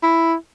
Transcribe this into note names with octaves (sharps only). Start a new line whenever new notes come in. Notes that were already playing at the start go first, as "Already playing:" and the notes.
E4